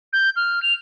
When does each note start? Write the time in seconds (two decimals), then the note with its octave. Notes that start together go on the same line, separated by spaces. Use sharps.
0.13 G6
0.36 F6
0.63 F7